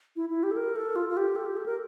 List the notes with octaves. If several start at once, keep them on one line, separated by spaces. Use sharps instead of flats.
E4
E4
G4
A4
A#4
A4
F4
F4
G4
A4
G4
A4
A#4